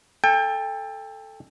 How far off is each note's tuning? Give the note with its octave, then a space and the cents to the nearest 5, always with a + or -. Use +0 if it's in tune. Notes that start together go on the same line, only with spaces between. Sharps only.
A4 +0 G5 +30